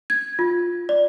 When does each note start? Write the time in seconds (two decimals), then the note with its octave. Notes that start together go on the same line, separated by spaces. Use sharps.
0.10 G#6
0.39 F4
0.89 D5